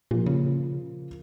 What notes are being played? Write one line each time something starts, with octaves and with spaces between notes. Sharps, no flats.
A#2 F3 A#3 F4
C#3